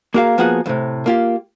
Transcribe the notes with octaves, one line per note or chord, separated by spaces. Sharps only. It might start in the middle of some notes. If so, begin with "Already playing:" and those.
A#3 F#4 G#4 A#4 E5 F5
F3 A#3 B3 F#4 G#4 F#5
D#2 A2 C3
A#3 F4 G4